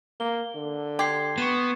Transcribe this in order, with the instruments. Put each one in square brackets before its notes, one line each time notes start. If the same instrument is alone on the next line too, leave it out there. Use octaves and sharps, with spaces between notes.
[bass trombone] A#3 [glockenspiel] G7
[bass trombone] D3
[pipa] G4 [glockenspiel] C6 G#6 C7
[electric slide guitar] B3 [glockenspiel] C#6 E7